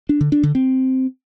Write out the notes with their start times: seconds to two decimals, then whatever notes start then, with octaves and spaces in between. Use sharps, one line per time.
0.09 D4
0.21 D3
0.32 D4
0.43 D3
0.55 C4